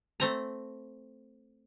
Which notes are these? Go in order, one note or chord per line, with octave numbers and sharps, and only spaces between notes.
A3 C4 A#5